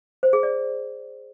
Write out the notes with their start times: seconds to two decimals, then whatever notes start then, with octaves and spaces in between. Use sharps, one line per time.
0.23 C5
0.33 G#4
0.43 D5